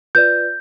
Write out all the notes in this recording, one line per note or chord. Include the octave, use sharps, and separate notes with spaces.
F4 B4 D5 G6